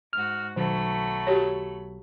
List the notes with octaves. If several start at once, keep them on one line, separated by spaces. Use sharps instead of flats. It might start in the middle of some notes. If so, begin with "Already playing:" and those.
G#2 F#4 F6
B1 D#3 F#3 A3 B5
F#4 G4 C#5